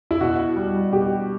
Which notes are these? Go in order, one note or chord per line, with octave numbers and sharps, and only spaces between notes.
E4
B2 F#4
G3
B2 G4